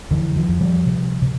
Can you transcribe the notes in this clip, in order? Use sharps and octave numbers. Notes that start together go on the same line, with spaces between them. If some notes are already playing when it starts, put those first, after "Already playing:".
F2 D3 E3
D#3 F3
F2
F3 G3
C3
C3